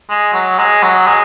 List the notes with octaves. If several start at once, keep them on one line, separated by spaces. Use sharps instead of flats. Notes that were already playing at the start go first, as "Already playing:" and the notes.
G#3
F#3
G#3
F#3
G#3